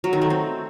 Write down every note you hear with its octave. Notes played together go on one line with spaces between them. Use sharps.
F#3
D#3
A3
C4